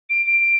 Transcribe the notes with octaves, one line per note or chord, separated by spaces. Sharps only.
D7
D7